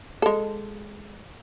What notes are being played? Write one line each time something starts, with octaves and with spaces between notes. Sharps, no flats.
G#3 A4